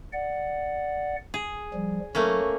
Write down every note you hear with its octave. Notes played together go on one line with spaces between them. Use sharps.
D5 F#5
G#4
F3 G3
F#3 A3 A#3 C#4